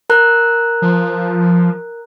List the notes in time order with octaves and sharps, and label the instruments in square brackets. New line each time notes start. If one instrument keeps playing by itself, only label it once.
[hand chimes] A#4 A#5 F#6
[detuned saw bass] F3